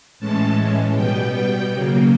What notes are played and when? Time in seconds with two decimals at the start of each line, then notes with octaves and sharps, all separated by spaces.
0.20 A2 E3 G#3 C#4 A5
0.95 B2 G3 B3 G5
1.70 C#3 F#3 A#3